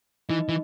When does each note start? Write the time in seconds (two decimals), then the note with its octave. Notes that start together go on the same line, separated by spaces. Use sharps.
0.29 E3 D#4 D#5
0.49 E3